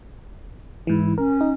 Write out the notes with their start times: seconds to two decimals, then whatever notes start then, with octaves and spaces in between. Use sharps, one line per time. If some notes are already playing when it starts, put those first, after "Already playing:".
0.87 G#2 E3 E4
1.18 C#4 A#4
1.41 D#4